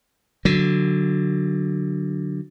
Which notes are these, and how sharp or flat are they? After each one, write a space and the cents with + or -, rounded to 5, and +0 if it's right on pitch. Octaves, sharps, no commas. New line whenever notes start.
D3 +0 F#3 +0